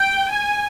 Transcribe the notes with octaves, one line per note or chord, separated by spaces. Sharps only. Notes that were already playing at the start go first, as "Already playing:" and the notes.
Already playing: G5
G#5